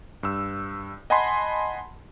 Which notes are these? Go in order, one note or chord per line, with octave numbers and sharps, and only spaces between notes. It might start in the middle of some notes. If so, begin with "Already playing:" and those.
G2 E6
D#5 F#5 G#5 A5 B5 C6